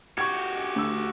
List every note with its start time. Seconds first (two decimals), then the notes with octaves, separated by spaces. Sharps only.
0.18 F#4 G4 C#6 G#6
0.76 D2 E6